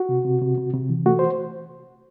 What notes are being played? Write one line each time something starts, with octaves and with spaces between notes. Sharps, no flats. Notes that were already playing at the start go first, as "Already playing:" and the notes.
Already playing: F#4
C3
C3
C3
C3
C3
E3
A3 F#4
C5